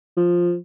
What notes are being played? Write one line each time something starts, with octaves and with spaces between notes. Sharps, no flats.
F3